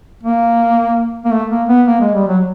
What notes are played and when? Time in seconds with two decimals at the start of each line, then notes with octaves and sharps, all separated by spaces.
0.23 A#3
1.25 A#3
1.32 A3
1.51 A#3
1.69 B3
1.87 A#3
2.01 G#3
2.15 G3
2.28 F#3